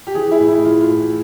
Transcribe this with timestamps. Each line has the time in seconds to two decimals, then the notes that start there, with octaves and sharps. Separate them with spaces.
0.07 G4
0.15 E3 G#4
0.31 E4
0.40 A2
0.48 E4
0.65 E3 F4
0.81 F4
0.90 A2